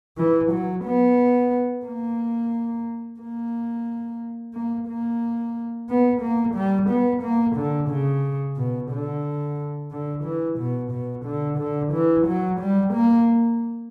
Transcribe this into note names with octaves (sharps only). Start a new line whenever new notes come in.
E3
F#3
B3
A#3
A#3
A#3
A#3
B3
A#3
G3
B3
A#3
D3
C#3
B2
D3
D3
E3
B2
B2
D3
D3
E3
F#3
G3
A#3